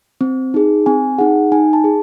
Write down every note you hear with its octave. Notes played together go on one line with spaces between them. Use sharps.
C4
D#4 G#4
C4 G#5
D#4 G#4 F#5
D#4 G#5
A5
G#4